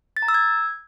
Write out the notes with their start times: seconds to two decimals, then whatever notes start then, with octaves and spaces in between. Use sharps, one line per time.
0.17 A6
0.22 A#5
0.28 E6
0.34 G#6